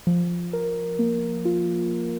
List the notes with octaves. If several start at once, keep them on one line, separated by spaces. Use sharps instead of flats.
F3
A#4
A#3
F4